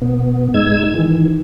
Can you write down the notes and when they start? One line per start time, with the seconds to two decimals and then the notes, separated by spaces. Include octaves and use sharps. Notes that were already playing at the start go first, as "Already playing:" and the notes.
0.02 B2 B3
0.54 G#2 G#3 D#4 E6 G#6
0.94 D#3 E3